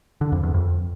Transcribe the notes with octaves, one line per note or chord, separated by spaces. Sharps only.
D3
F2
E2
F2